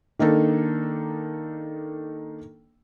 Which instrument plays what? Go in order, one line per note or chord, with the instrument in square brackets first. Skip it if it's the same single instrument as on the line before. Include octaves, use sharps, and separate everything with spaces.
[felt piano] D#3 A#3 D4 D#4 A4